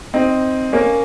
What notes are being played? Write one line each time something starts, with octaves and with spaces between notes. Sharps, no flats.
C4 D#4
A#3 C#4